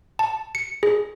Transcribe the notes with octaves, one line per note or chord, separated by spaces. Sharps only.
A5
C#7
G#4